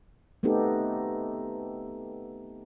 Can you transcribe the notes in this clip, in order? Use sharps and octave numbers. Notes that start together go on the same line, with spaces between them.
A3 B3 C4 D#4 G4 A4